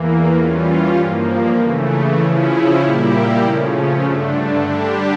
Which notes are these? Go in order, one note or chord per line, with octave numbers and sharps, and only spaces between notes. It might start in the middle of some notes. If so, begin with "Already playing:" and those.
Already playing: E2 E3 A#3
E3 G3 C#4 F4
G2 F3 A#3
C#3 E3 A3
C#3 F3 C#4 E4
A#2 G3 A#3 E4 G4
C#3 F3 A3 C#4
G2 D3 A3 D4
D3 G3 D4 G4